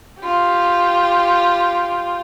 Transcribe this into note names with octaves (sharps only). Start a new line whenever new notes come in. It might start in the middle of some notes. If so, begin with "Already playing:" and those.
F4 G4